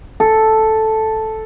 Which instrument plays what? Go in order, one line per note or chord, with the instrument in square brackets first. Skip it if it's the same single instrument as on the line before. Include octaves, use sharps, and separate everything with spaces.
[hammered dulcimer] A4